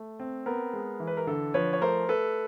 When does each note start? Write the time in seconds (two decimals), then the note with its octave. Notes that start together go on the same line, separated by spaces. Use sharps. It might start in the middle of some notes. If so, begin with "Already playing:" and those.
Already playing: A3
0.20 C4
0.46 B3 A#4
0.73 G#3
1.00 E3
1.07 B4
1.17 A#4
1.27 D3 A4
1.54 F3 B4 C#5
1.73 C#5
1.81 A3 A#4 C5
2.09 A3 A4 B4